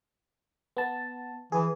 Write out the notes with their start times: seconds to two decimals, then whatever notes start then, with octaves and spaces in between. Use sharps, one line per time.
0.77 B3 A5
1.52 E3 G#4